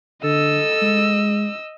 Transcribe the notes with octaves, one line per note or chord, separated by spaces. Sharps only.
D3 A4 D#5 E6
G#3